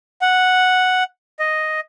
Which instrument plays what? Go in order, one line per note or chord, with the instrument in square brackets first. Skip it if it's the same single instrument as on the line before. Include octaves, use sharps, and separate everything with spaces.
[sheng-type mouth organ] F#5
D#5